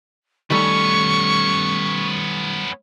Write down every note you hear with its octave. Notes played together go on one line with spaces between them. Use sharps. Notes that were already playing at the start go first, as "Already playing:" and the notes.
D#3 G3 A3 B3 C#4 C#6